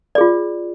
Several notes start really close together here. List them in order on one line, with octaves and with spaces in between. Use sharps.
D5 G#4 F4